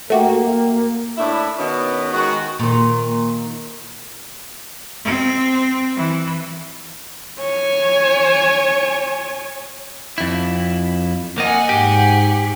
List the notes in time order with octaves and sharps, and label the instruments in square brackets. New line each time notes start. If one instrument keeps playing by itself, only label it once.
[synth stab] A3 F#4 G4 [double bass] A#3
[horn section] A2 D4 E4
B2 D#3 C#4 B4 D#5
D#3 G#3 F#4
[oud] A#2 D#3
[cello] C4
E3
[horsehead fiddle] C#5 G#5
[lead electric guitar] F2 E4
[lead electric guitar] A#3 D#5 [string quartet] F#5 G#5
[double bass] G#2 [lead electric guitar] G4